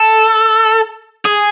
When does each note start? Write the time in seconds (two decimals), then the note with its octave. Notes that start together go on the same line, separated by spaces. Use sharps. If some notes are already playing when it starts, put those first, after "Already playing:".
Already playing: A4
1.25 G#4